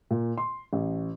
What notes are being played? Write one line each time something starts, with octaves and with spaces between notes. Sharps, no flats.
A#2
C6
A1